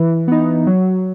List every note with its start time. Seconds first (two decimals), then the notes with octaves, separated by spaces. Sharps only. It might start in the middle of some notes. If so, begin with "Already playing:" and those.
Already playing: E3
0.28 B3 D#4
0.67 F#3